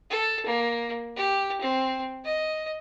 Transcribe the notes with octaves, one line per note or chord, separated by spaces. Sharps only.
A4
A#3
G4
C4
D#5